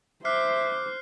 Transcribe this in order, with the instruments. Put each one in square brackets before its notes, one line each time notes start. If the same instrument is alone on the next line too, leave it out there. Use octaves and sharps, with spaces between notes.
[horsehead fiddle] C5 [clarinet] E5 [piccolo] D6 [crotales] F6 F#6 C7